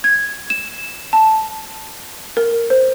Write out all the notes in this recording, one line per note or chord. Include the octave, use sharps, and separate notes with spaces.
G#6
E7
A5
A#4
C5